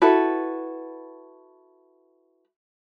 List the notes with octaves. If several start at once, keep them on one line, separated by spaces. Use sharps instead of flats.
E4 F#4 A4 B4